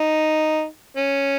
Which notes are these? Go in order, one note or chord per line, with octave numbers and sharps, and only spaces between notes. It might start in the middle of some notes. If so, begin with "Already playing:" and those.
Already playing: D#4
C#4